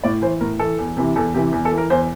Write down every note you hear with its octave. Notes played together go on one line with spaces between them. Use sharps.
A2 D5
E3 C5
A2 A#4
E3 A4
E2
C3 E3
E2 A4
C3 E3 G4
E2
A4
E3
A#4
E2 C5